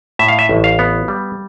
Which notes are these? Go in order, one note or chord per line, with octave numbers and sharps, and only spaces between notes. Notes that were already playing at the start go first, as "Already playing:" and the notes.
A2 E5
F5
E5
A1
F5
B3
G3